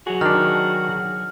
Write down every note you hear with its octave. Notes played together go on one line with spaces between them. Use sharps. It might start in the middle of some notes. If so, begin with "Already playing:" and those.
F#3 F#4 G#4
D#3 D4 F6